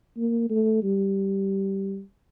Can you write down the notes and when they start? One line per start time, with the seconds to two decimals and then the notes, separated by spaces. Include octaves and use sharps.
0.17 A#3
0.50 A3
0.83 G3